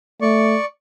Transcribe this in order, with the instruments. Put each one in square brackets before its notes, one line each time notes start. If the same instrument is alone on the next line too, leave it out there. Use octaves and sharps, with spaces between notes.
[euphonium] A3 [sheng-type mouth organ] D5 C#6